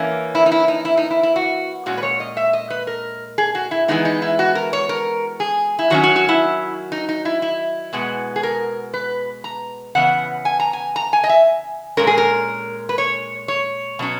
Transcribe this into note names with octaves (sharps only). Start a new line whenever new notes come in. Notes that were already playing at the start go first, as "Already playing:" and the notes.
Already playing: E3 A#3 C#4
E4
D#4
E4
D#4
E4
D#4
E4
E4
F#4
A#2 G#3 C#4 F#4
B4
C#5
D#5
E5
D#5
B4
A#4
G#4
F#4
E4
E3 G#3 B3 D#4
D#4
E4
F#4
A#4
C#5
A#4
G#4
E4
D#3 F#3 C#4 F#4
F#4
F#4
E4
D#4
D#4
E4
E4
B2 G#3 B3
G#4
A#4
B4
A#5
C#3 E3 B3 F#5
G#5
A#5
G#5
A#5
G#5
D#5
E5
A#2 G#3 C#4 A#4
G#4
A#4
B4
C#5
C#5
B2 F#3 C#4